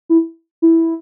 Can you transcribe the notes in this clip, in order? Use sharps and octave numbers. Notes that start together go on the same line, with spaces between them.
E4
E4